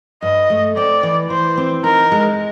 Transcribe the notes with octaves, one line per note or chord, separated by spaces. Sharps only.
G2 D#5
A3
C4 D5
E3
E3 C5
C4
D#4 A#4
G#3